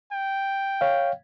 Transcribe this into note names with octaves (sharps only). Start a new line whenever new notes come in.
G5
C#5 F5